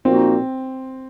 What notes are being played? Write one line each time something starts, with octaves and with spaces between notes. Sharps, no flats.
A#2 F3 A#3 C4 D#4 F#4